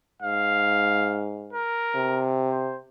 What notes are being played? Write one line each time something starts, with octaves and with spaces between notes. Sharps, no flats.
G#2 F5
A#4
C3
C5